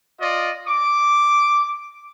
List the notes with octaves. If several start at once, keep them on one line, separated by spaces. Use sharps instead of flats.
F4 D5 D#5
D6